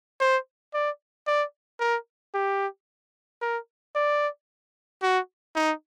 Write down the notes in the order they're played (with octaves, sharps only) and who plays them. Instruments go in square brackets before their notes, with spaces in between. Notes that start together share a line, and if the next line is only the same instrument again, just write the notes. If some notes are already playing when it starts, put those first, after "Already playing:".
[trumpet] C5
D5
D5
A#4
G4
A#4
D5
F#4
D#4